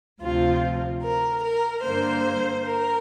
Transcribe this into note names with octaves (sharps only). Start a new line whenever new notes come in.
D2 C3 F3 C4 F4
A#4
A#4
G2 D3 A#3 C5
A#4